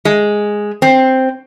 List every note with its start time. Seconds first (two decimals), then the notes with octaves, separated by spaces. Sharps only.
0.05 G#3
0.82 C4